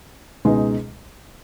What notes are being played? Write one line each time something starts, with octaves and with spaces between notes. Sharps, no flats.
C#2 B2 G#3 D#4 G#4